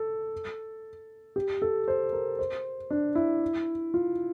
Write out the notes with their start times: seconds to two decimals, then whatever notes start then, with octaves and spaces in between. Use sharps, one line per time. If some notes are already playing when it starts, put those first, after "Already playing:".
Already playing: A4
1.36 G4
1.62 A4
1.88 C5
2.13 A#4
2.39 C5
2.90 D4
3.15 E4
3.94 F4